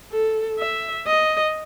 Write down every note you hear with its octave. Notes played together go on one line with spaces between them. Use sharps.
A4
E5
D#5